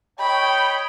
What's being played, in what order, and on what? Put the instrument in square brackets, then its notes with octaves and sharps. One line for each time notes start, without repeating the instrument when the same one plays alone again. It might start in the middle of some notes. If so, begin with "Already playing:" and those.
[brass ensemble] C#5 D#5 G5 [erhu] B5